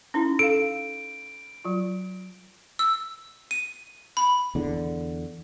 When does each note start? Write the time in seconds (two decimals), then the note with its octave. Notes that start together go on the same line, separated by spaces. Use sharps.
0.14 C#4 D#4 E4
0.39 A4 F5 D7
1.65 F#3 F4
2.79 E6
3.51 D#7
4.17 B5
4.55 E2 D3